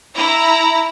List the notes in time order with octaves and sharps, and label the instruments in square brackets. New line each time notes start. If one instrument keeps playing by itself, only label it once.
[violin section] E4 A#5